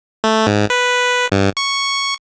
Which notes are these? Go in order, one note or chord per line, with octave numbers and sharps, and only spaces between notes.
A3
G#2
B4
G2
C#6